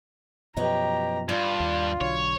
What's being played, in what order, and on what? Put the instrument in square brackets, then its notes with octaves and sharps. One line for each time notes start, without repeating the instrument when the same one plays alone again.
[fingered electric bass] F#2 B2 F3 [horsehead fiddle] G4 A#5 [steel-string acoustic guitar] B4 C#5 D#5
[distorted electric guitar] G2 [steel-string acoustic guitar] D4 [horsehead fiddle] F4
[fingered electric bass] D#2
[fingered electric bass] B1 D3 F#3 [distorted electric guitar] C#5